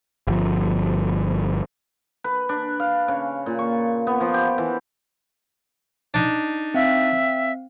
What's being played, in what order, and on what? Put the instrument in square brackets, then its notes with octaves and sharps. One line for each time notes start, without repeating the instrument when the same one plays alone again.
[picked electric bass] G1 F3
[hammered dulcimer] B4
D4
F5
C#3
A#2
C#6
B3
F3
G4
E3
[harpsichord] D4 D#4
[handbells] C4 F5 [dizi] E5